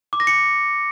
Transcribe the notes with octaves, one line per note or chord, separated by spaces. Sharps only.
D6
A#6
C#7